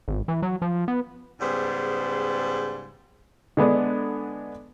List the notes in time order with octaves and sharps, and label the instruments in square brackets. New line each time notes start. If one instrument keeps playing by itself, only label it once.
[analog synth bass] G#1
E3
F#3
F3
B3
[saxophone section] G#2 C#3 G3 B3 G#4 C5
[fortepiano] D3 G#3 B3 D4